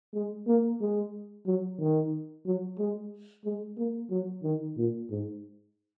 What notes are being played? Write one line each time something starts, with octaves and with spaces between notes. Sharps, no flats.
G#3
A#3
G#3
F#3
D#3
F#3
G#3
G#3
A#3
F#3
D#3
A#2
G#2